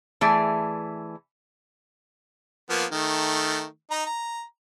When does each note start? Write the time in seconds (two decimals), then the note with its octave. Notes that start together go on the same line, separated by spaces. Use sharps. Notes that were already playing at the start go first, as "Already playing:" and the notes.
0.21 E3 A3 G#4 D5
2.70 F3 A#3 B3
2.92 D#3 A3
3.91 D#4 A#5
4.06 A#5